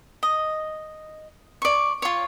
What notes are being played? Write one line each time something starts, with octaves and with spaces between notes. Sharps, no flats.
D#5
D5 C#6
F4 C#5